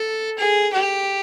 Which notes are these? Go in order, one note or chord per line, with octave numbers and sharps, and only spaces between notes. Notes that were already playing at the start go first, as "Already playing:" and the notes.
Already playing: A4
G#4
G4